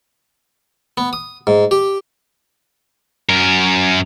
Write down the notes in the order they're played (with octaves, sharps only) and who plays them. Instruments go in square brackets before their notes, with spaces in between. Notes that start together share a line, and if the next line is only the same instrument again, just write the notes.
[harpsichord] B3
D#6
G#2
G4
[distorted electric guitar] F#2 A#4